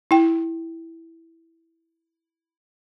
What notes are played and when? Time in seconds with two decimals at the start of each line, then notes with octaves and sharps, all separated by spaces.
0.11 E4 G5